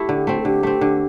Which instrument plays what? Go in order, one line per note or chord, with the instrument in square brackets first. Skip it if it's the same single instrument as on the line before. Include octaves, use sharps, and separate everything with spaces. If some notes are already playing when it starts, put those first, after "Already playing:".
Already playing: [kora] A3 E4 [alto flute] G4
[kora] D3
A3 C4
[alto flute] A4
[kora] D3 [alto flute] G4
[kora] A3 C4
D3